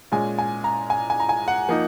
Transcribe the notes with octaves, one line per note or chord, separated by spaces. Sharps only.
A#2 G#3 C#4 G#5
G#5
A#5
G#5
G#5
A#5
G#5
F#5
F3 A#3 D#4